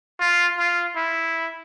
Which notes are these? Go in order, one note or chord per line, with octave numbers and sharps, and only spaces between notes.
F4
F4
E4